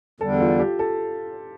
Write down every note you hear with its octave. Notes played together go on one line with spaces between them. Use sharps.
E2 D3 G3 A4
F4
G4
A4